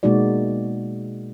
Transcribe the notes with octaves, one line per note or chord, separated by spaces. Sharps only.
B2 G#3 A#3 D#4 F#4 D5